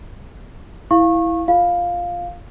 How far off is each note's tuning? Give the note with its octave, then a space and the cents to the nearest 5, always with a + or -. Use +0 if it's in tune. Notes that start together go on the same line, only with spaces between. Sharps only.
E4 +0 F5 +0 C#6 -25
F4 +0 F5 +5